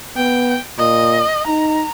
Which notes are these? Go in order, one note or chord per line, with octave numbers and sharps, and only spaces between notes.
B3 G5
A#2 D#5
D#4 A#5